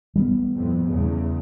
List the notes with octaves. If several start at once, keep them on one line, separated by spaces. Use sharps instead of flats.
G3 G#3 B3
F2 A2
E2 C#3